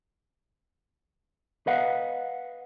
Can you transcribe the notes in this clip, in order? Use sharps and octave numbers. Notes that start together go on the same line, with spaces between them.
B4 D#5 F5 F#5